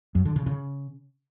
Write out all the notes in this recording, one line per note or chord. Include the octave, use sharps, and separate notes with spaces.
F#2
D3
C#3
C#3